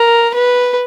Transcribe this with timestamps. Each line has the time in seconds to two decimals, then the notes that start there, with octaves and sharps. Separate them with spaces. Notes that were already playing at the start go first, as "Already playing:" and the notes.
Already playing: A#4
0.34 B4